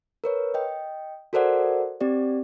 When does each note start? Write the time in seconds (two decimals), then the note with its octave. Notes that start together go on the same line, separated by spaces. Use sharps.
0.24 A#4 B4 C#5
0.54 D#5 G5
1.33 F#4 A4 A#4 C5 D5 F#5
2.01 C4 G4 D5